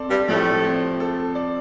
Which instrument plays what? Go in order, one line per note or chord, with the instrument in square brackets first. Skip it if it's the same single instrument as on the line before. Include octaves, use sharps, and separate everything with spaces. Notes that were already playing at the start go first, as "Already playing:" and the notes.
Already playing: [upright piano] C4 A4 D5
[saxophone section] G2 G3
[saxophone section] A2 A3 [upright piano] F3
[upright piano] C4
A4
D5